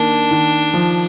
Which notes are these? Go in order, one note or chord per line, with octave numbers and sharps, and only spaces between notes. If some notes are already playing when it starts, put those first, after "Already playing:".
Already playing: D#3 A#3 D4
D#3
F3